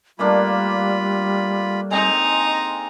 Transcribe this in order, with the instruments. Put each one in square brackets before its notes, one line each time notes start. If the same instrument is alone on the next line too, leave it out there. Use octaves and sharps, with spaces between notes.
[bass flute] G3 [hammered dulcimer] A3 A#3 D4 [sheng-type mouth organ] F4 B5
[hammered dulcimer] G#3 C4 [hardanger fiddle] D#4 A#5